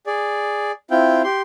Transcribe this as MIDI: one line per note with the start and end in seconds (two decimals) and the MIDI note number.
0.07 0.72 68
0.07 0.72 74
0.91 1.22 60
0.91 1.22 64
0.91 1.22 65
0.91 1.22 79
1.24 1.42 67
1.24 1.42 84